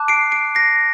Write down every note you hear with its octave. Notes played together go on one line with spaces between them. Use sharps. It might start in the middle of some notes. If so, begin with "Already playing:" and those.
Already playing: A5 D6 F#6
C7 D7
C7 D7
A#6 C7